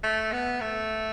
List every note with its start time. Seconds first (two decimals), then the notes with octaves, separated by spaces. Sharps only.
0.04 A3
0.32 B3
0.61 A3